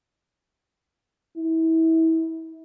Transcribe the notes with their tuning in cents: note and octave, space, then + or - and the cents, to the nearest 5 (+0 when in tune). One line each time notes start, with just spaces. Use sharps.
E4 -30